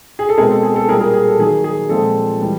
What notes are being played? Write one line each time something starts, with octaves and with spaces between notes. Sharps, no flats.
G#4
A4
B2 G#3 C4 G#4 A#4
A4
G#4
A4
A#2 G3 A#3 G#4 A#4
G#4 A#4
G#4
A4
D#3 F#3 A#3 G#4
G#4
A#2 F3 G#3 C4 A4
E3 G3